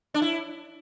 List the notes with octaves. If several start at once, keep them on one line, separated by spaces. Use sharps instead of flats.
D4
E4